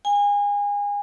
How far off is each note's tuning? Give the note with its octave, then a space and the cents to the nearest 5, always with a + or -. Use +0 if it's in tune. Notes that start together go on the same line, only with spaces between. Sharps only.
G#5 -30